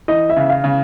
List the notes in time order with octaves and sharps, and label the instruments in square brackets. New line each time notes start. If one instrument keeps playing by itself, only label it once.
[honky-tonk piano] E3 [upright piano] D#5
[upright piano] E5
[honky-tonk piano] C#3
[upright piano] F5
[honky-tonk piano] C#3